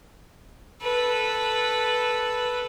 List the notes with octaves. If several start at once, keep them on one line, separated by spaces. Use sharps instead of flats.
A4 B4